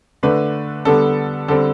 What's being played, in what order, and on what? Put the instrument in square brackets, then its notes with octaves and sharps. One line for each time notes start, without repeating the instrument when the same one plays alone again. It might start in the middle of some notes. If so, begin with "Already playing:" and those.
[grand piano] D3 A3 D4 B4
D3 G3 B3 D4 A4
D3 G3 C4 A4